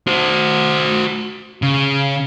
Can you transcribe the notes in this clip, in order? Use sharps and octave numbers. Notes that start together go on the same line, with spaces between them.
F#4 C5
C#3